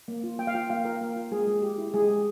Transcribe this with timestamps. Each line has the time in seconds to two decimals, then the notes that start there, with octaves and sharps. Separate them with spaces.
0.08 A#3
0.24 F4
0.39 A#3 G5
0.47 F5
0.55 F4 G5
0.70 A#3 F5
0.85 F4 A#4
1.01 A#3
1.16 F4
1.31 G#3 G#4
1.47 G#3
1.62 G4
1.78 E4
1.94 G#3 G#4
2.10 G#3